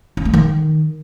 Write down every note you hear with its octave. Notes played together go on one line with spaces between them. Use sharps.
C#4
A3
D#3